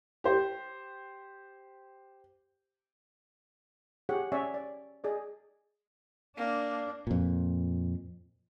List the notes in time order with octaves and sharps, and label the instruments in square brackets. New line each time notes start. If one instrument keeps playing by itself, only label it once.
[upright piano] G4 C5
[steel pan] G4 G#4 C#5 F#5
C#4 C#5 D5 E5 G#5
D5
G#4 D5 D#5
[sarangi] A#3 [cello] D4 D5
[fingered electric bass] F2 A#2